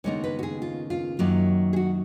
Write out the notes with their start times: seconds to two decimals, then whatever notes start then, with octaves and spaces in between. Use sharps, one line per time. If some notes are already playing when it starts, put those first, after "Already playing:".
0.04 D#2 C#3 G#3 B3 D#4 C#5
0.24 B4
0.39 F#4
0.43 G#4
0.62 F4
0.90 F4
1.19 F#2 D#3 F#3 A#3 C#4
1.73 G#4
1.76 F#4